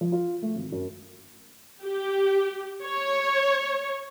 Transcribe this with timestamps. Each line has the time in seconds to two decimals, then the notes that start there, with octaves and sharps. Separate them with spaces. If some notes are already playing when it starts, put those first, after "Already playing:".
0.01 F3
0.12 F4
0.42 A3
0.56 G#1
0.72 F#2
1.82 G4
2.83 C#5